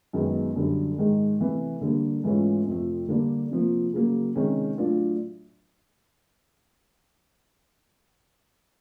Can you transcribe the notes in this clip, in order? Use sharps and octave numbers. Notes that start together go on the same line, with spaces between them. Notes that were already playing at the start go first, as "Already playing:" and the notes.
F#2 D#3 G#3 B3
F#2 D3 G3
G#2 D#3 G#3
C3 E3 A3
D3 G3 A#3
G#2 E3 A3 C#4 F4
F2 C3 F3 A3
D3 G3 A#3 D4
C3 F3 A#3
C#3 F#3 A#3
C3 D#3 G#3 C#4
A2 F#3 A3 D4 F4